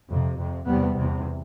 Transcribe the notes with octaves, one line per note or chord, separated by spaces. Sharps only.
F2 C3
F2 C3
E2 C3 G3 B3
E2 C3